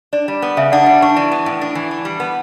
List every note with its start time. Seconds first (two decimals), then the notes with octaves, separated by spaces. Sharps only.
0.13 D4 D5
0.28 G3
0.42 B3
0.57 C#3 E5
0.72 D4 D5 F#5
0.86 G3
1.01 D4 A5 C#6
1.16 E3
1.31 B3
1.46 A2
1.61 D4
1.75 E3
1.91 D4
2.05 G3
2.20 B3